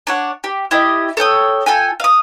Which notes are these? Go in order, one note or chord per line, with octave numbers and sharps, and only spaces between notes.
D4 C#5 F#5
G4
E4 G4 D#5
A4 C#5 G5 D#6
F4 A4 G5 G#5
F5 D#6